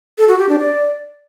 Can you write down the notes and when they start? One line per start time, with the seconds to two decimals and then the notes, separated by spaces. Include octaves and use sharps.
0.18 A4
0.28 F#4
0.39 G4
0.49 D4
0.59 D5